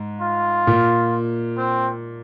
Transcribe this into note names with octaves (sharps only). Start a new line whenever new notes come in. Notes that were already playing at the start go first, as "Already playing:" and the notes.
Already playing: G#2
F4
A#2
C4